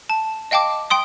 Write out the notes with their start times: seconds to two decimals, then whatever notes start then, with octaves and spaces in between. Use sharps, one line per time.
0.10 A5
0.51 D#5 F5 G5 A5 D6
0.90 G5 C6 D#6